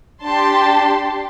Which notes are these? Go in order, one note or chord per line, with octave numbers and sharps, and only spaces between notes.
D4 G4 A5 C6